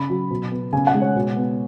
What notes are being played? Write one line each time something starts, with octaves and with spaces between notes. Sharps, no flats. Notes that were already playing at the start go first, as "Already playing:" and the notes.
Already playing: C#3 B5
F#3
B2
B3
C#3 G#5
F#5
G#3
C#5
B2
B3